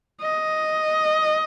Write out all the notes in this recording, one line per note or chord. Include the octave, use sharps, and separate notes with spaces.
D#5